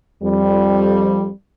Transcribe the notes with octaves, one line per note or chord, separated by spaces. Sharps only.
F2 G3